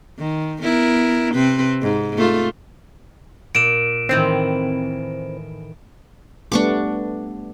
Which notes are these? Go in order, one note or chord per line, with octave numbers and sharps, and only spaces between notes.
D#3
B3 E4 A#4
C3 C4 B4
G#2
A3 F4
A#2 D7 E7
A2 D#3 E3 C4
G3 A3 B3 D4 C#6 D6